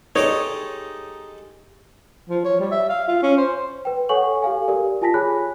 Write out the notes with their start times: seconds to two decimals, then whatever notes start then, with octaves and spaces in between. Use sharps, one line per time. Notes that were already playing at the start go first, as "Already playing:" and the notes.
0.15 G#3 D#4 G4 A4 C#5
2.29 F3
2.45 C#5
2.59 G3
2.71 E5
2.89 F5
3.08 F4
3.23 C#4
3.37 C5
3.85 B4 G5
4.09 A4 C#5 F#5 G#5 C#6 F#7
4.42 G4 A4 F5 G#5
4.68 G4 A#4 D5
5.02 F4 G#5 A5 A#6 B6
5.14 G#4 C#5 G#5 B5 F#6